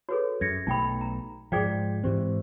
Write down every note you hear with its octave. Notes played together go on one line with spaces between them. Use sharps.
F#4 G#4 A4 B4 C#5
F#2 G#6 A#6 C#7
B1 A3 D#4 G5 B5
A#5
G#2 F3 G#4 D5 G5 B6
G#2 E3 C4 G4 C5